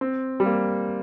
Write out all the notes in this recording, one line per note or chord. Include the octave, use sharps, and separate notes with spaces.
C4
G3
A#3